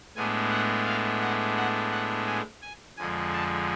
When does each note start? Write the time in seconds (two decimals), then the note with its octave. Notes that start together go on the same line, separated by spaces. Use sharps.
0.16 A2 G#3 B3 D4 G#5
0.51 F#5
0.86 F5
1.22 F#5
1.57 F#5
1.91 F#5
2.27 G#5
2.62 G#5
2.97 F2 D3 F3 G#3 G#5
3.33 A5